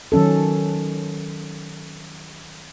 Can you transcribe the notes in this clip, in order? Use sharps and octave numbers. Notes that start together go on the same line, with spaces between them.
D#3 F#3 C#4 A4